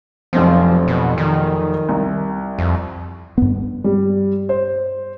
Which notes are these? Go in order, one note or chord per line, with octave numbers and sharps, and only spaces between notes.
F1 B1 F3 C4
B2
D#3
C2
F2
G2 B3
G3
C5